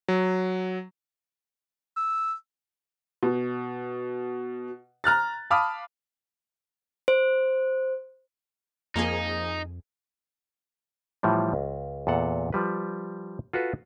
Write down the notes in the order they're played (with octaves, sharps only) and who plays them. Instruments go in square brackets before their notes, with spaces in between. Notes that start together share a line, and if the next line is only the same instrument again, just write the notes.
[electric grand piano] F#3
[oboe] E6
[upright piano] B2
A#5 F6 F#6 A6
F5 A5 B5 D6 D#6 F6
[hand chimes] C5
[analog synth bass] F2 [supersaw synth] F3 A#3 G#4 [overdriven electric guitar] D#4
[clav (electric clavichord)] A2 E3 F3 G3
C#2
E2 A#2 A4 F#5
F3 G3 B4
F4 F#4 A4 B4